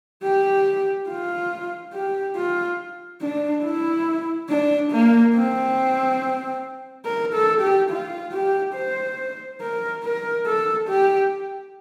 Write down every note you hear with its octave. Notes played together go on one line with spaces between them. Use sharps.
G4
F4
G4
F4
D4
E4
D4
A#3
C4
A#4
A4
G4
F4
G4
C5
A#4
A#4
A4
G4